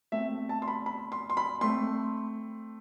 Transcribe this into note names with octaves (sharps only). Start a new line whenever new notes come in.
B2 A3 C4 E5
A5
C6
B5
B5
C6
C6
B5
A3 C4 C6